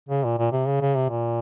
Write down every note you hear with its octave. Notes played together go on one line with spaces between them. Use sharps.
C#3
A#2
A#2
C3
C#3
C#3
C3
A#2